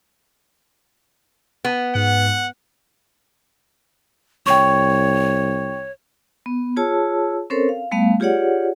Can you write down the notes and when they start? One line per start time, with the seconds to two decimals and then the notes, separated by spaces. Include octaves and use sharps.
1.65 B3
1.95 G#2 F#5
4.47 C2 C#5 G5 C#6
6.46 B3
6.76 F4 G#4 C#5 A5 E6
7.50 C4 C#4 A4 A#4 C5 C#5
7.69 F5
7.91 G3 A3 B3 F5
8.20 F4 G4 G#4 C#5 D5 F#5